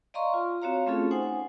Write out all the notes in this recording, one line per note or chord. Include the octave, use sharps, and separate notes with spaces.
D5 D#5 F5 A#5 C6 C#6
F4
C4 F#4 C#5 F5 A#5
A3 C4 C#4 F4 G#4 A4
D#4 C5 F#5 G#5